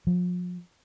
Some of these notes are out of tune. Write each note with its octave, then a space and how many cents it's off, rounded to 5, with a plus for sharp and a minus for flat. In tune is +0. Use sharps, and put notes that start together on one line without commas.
F3 +40